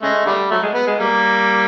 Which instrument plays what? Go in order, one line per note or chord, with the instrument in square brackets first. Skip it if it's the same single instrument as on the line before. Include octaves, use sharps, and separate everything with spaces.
[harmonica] C#3 G#3 [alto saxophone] A3
[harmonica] D3 G3
[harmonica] F#3 [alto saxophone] A3
[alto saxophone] G#3
[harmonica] B3
[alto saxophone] G#3
[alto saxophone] G3 [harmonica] A#3